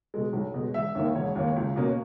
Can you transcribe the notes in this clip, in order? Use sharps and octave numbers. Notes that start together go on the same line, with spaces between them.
B2 G#3
B1
B2 G#3
E1 E5
D#2 D#3 A#3
E1 C#5
D#2 D#3 A#3
C#2
B2 A#3 C#4